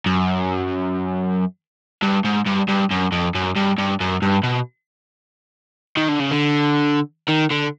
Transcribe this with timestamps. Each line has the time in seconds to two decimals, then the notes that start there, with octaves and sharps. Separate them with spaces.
0.06 F#2
2.03 G2
2.25 G#2
2.46 G2
2.69 G2
2.91 F#2
3.12 F2
3.35 F#2
3.56 G2
3.78 G2
4.00 F#2
4.22 G2
4.43 B2
5.97 D#3
6.09 D3
6.20 C#3
6.32 D3
7.28 D#3
7.50 D3